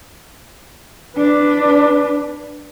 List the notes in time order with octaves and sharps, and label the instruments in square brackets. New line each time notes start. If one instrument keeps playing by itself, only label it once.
[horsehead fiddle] D4 B4